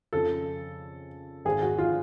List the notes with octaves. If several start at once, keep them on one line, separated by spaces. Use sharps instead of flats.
F2 C#3 F3 A4
G#1 G#2 D#3 G#4
F#4
F4